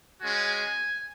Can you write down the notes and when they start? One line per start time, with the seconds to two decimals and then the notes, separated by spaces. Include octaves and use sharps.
0.21 G#3 C#4 F#4 G#5